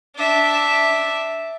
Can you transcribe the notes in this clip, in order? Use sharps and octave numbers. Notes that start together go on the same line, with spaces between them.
D4 E5